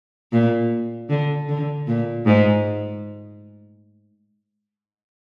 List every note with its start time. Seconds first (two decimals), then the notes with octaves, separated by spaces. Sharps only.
0.32 A#2
1.09 D3
1.49 D3
1.87 A#2
2.26 G#2